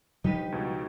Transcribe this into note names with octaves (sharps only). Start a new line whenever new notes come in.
F3 G3 D4 D#4 G4 B4
C#2 B2